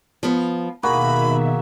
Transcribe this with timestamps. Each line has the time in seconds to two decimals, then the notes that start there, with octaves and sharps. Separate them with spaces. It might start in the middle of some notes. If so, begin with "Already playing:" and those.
0.23 F3 B3
0.83 D#2 B2 D#3 A#3 F#4 G#4 E5 B5